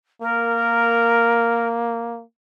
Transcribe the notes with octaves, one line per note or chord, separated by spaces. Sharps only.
A#3 A#4